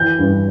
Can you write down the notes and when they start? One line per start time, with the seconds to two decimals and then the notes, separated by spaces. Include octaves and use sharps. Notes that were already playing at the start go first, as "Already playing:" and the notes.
Already playing: E3 G6
0.19 G2